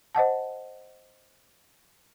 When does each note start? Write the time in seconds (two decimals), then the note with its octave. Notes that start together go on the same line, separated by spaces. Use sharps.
0.15 C5 D#5 F#5 A5